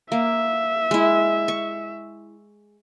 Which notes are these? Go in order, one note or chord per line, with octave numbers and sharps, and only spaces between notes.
A#3 E5
G#3 E4
C#6